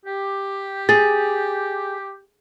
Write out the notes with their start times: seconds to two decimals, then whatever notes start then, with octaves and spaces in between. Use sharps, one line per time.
0.05 G4
0.89 G#4 A6